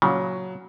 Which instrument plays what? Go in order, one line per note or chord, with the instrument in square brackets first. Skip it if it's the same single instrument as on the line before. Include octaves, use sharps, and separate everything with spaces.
[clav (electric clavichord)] A#2 C#3 [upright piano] F#3